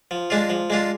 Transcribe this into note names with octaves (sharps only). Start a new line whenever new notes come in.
F3
G#3 D4 F4
F3
G#3 D4 F4